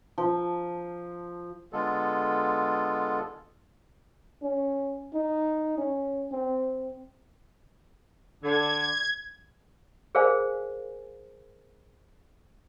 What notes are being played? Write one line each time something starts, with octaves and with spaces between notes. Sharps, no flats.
F3
D3 G#3 B3 F4 A4
C#4
D#4
C#4
C4
D3 G#6
G#4 A#4 C5 D5 F5 G#5